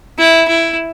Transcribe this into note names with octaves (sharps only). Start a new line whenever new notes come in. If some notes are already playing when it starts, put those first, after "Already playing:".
E4
E4